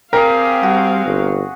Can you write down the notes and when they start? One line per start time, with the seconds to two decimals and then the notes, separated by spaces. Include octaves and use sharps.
0.13 C4 G4 G#4 A#4 F5
0.63 G3 F#4
1.06 G1